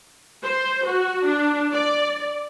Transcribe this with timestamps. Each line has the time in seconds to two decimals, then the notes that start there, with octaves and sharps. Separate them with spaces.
0.44 C5
0.86 F#4
1.25 D4
1.72 D5